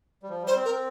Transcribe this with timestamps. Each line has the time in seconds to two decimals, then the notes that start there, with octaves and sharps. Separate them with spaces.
0.23 G3
0.29 F3
0.43 G3 C5
0.56 C4
0.65 A#4
0.69 C4